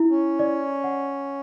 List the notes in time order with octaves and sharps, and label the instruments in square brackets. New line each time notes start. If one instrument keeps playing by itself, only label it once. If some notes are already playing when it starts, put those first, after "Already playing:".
Already playing: [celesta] E4
[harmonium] C#4
[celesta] D5
F#5